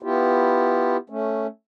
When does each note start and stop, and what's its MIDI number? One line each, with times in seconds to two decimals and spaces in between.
0.03 0.97 59
0.03 0.97 64
0.03 0.97 65
0.03 0.97 67
1.10 1.47 57
1.10 1.47 61